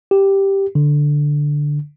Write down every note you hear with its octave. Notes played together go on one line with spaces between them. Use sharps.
G4
D3